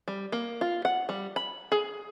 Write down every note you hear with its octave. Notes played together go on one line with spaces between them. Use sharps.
G3
A#3
F4
F#5
G3
B5
G#4